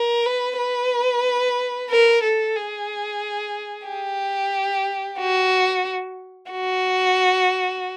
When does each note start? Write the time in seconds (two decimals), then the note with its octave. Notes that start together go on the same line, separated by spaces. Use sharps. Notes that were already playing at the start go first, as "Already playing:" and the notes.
Already playing: A#4
0.26 B4
0.58 B4
1.90 A#4
2.24 A4
2.56 G#4
3.87 G4
5.20 F#4
6.52 F#4